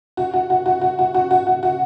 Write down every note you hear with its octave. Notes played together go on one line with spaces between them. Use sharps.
F#4
F#4
F#4
F#4
F#4
F#4
F#4
F#4
F#4
F#4